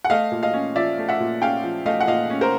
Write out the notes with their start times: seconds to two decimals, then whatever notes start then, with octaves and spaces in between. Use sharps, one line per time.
0.05 F#5
0.10 A3 D#5 F5
0.32 A#2
0.43 D#5 F5
0.54 C#4
0.76 F3 D5 E5
0.98 A3
1.09 E5 F#5
1.20 A#2
1.42 C#4 F5 G5
1.64 F3
1.86 A3 D#5 F5
2.01 F#5
2.08 A#2 D#5 F5
2.30 C#4
2.41 A#4 C5